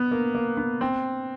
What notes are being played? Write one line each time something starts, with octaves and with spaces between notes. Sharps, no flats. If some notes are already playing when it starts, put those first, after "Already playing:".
Already playing: B3
A#3
A#3
B3
C4